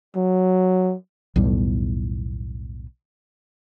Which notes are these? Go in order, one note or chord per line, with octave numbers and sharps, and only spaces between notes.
F#3
B1 E2 A2 G3